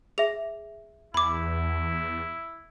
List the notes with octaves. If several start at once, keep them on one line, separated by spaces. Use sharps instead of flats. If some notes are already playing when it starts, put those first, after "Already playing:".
G#4 E5 F7
E2 E4 B5 D6